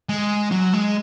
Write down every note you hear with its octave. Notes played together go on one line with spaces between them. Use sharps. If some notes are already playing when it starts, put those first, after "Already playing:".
G#3
F#3
G#3